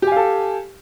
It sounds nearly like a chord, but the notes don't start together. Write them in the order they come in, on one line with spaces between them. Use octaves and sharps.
G4 G#5 F5 A4